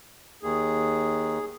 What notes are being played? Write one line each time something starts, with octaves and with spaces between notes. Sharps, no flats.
D#2 G#4